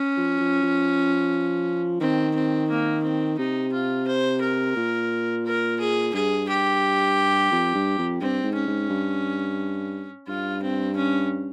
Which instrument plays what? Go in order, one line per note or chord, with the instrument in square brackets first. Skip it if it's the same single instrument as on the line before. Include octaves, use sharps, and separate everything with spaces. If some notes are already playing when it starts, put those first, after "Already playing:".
Already playing: [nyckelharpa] C#4
[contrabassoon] F3
F3
F3
[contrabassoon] D#3 [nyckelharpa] C4
[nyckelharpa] C4
A#3
C4
[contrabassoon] C3 [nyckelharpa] D#4
[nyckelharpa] F4
C5
A#4
[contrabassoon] A#2
[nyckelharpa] A#4
G#4
[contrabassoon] G2 [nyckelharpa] G#4
[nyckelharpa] G4
[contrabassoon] F2
G2
F2
[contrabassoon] G2 [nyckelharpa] C4
[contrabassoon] G#2
[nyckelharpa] C#4
[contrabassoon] G#2
G2
[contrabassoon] G2 [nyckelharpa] F4
[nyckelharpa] C4
C#4